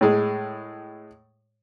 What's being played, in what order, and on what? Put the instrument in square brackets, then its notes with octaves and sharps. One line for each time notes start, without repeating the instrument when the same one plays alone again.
[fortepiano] A2 G#3